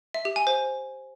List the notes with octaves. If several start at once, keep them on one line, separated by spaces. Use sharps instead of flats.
E5
G4
G#5
C5